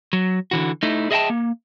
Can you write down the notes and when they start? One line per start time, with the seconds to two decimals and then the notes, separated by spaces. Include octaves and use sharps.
0.13 F#3
0.51 D3 E3 F#4
0.83 A3 D#4 E4
1.11 G#4 D#5 E5 F#5 G5 A5
1.30 A#3